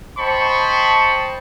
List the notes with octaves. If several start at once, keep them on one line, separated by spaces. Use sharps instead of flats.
C5 D#5 G5 A5 B5 C#6